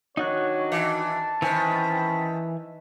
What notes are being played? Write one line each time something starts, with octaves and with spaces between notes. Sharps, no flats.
D#3 D4 D#4 F#4 C#5 F#6
E3 A5
D#3 E3 C4 C#4 G#5 B5 F#6